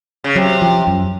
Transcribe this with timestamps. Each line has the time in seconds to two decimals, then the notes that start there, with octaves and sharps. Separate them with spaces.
0.24 C#3
0.35 C3 F#3
0.62 F3
0.87 F#2